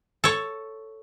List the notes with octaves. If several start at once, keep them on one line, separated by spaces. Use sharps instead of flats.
A4 C#5